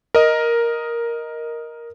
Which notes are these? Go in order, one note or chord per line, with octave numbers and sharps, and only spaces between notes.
A#4 D#5